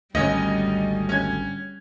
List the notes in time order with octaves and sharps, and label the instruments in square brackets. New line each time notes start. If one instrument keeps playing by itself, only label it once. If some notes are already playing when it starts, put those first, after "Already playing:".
[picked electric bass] G#1 D2 [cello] G3 [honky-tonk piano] C#4 D#5
[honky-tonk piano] C#4 G#6